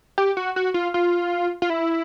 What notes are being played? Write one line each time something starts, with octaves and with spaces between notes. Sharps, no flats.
G4
F#4
F#4
F4
F4
F4
E4